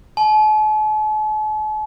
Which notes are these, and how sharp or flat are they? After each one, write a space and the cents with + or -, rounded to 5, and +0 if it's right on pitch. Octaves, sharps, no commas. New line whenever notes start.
A5 -45